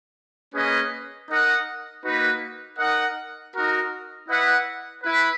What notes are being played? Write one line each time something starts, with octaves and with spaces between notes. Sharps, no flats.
A#3 C#4 G#4 B4 D#5
D#4 A#4 D#5 F#5
A#3 D#4 F#4 B4
D#4 A#4 D#5 F#5
D#4 F#4 A#4
E4 B4 D#5 F#5
E4 B4